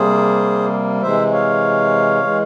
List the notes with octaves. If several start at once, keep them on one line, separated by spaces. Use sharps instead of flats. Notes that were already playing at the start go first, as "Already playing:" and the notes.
Already playing: C3 G3 A#3 G#4 C5
C3 E3 G#3 C5 E5
C#5 F5
E3 G#3